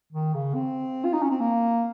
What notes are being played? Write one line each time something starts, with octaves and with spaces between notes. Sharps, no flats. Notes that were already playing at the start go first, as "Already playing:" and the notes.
D#3
C#3
C4
F4
D#4
C#4
C4
A#3